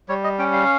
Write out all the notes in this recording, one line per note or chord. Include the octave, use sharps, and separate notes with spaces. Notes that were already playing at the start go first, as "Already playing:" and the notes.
G3 C#5
D#5
C#4 G5
F5